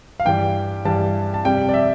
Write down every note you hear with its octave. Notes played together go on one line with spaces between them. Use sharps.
F5
G2 E3 G3 G5
G2 E3 G3 A5
A5
F2 C3 G3 G5
D5
E5